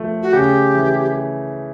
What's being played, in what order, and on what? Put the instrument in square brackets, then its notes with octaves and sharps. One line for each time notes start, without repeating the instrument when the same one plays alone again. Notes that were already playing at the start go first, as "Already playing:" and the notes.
Already playing: [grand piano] F3 A3
[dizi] F#4
[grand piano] C#3 [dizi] G4
[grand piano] E3